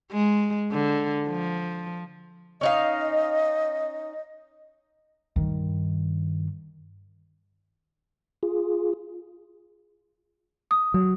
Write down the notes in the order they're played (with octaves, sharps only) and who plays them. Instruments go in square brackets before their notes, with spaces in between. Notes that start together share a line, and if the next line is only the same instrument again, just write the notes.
[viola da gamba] G#3
D3
F3
[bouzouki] C#4 D#4 F5 [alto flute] D#5
[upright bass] G2 D#3
[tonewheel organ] F4 G#4
[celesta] D#6
[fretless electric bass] F#3